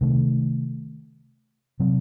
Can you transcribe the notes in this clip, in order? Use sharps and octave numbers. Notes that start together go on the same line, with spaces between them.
C3 D#3 A3
C3 F#3 C4